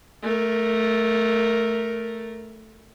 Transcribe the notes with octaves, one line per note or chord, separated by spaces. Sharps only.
A3 A#4